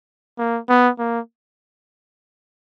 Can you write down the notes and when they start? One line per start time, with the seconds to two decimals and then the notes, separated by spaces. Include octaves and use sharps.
0.39 A#3
0.69 B3
0.99 A#3